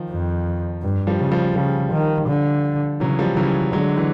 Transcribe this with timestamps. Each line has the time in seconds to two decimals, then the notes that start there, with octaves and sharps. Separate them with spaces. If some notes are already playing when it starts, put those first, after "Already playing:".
Already playing: D#3 F3
0.10 F2
0.83 G2
1.07 F3 G3
1.19 C#3
1.32 F3 G3
1.56 C#3 F3 G3
1.92 D#3
2.28 D3
3.00 C#3 E3 F#3
3.19 F3 G3
3.36 C#3 E3 F#3
3.73 D3 F#3 G#3
3.97 E3 F#3